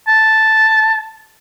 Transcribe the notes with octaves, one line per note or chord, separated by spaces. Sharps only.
A5